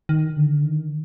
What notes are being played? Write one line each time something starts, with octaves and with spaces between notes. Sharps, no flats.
D#3
D3
D#3